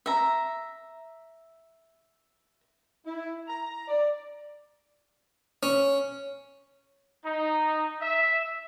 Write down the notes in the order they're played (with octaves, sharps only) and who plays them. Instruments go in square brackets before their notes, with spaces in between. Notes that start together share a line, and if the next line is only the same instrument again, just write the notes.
[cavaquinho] E5 A#5
[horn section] E4
A#5
D5
[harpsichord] C#4
[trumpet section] D#4
E5